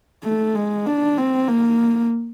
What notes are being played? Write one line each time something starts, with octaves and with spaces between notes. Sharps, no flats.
A3
G#3
D4
C4
A#3